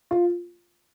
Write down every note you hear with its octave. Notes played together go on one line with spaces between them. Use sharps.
F4